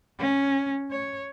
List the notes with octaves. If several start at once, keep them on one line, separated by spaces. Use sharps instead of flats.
C#4
C#5